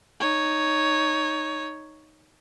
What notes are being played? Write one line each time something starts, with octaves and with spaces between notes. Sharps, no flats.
D#4 C#5